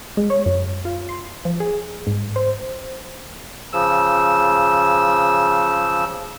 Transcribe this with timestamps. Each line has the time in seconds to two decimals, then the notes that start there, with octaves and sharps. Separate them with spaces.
0.17 G#3
0.30 C#5
0.46 F#2
0.85 F4
1.09 C6
1.45 F3
1.60 G#4
2.07 G#2
2.36 C5
3.73 C#3 F3 E6